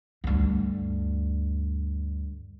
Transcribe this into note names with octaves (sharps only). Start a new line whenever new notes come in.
D2 G2